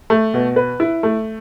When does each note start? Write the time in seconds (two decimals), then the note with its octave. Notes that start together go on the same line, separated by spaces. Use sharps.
0.10 A3
0.34 B2
0.56 B4
0.80 E4
1.03 A3